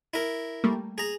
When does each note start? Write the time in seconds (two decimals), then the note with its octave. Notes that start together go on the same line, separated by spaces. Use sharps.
0.14 E4 A#4
0.64 G3 A3 A#3
0.98 G#4 A#5